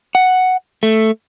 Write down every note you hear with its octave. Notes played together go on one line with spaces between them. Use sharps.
F#5
A3